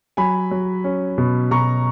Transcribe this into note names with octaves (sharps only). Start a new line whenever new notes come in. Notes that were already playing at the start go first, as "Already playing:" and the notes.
F#3 G#5 B5
F#3
C#4
B2
B2 A#5 C#6